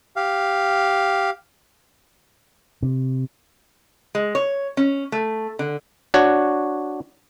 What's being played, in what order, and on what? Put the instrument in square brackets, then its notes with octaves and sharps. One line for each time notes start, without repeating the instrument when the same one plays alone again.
[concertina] G4 F5
[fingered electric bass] C3
[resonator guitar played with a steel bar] G#3
C#5
C#4
A3
D3
[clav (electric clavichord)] D4 F#4 C#5